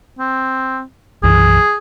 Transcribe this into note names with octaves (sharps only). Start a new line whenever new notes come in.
C4
B1 F#2 E3 G#4